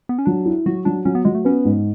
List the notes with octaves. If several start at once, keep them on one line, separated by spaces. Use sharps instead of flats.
B3
C#4
F#3 D4
E4
F#3 F#4
F#3 D4
F#3 C#4
B3
F#3 G#3
A3
B3 C#4
G#2